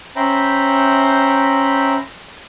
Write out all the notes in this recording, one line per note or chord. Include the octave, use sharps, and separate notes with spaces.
C#4 C5 E5 G5 A#5 B5